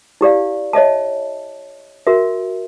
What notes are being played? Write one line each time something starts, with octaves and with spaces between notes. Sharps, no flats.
E4 G4 D5 F5
C#5 D#5 E5 A5
F#4 A#4 E5